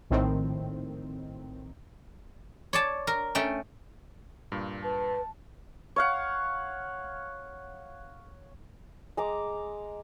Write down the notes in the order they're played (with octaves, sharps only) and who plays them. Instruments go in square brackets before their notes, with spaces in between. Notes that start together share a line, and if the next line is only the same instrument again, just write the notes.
[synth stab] A#1 A2 D#3 C4
[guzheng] C#5 D5 A5
A#4
A3 C#4 G5
[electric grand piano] G2 A#2
[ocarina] B4 [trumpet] A5
[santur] C#5 F5 F#5
G#3 A#5 D6